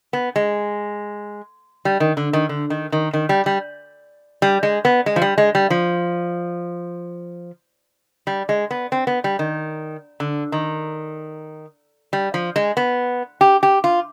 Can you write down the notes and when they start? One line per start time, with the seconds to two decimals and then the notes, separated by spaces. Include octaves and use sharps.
0.13 B3
0.36 G#3
1.85 G3
2.00 D#3
2.17 D3
2.33 D#3
2.49 D3
2.70 D#3
2.92 D#3
3.13 D#3
3.29 G3
3.46 G3
4.42 G3
4.63 G#3
4.85 B3
5.06 G#3
5.16 F3
5.22 G3
5.38 G#3
5.55 G3
5.70 F3
8.27 G3
8.49 G#3
8.71 B3
8.92 C4
9.07 B3
9.24 G3
9.39 D#3
10.20 D3
10.52 D#3
12.13 G3
12.34 F3
12.56 G#3
12.77 B3
13.41 G4
13.63 G4
13.84 F4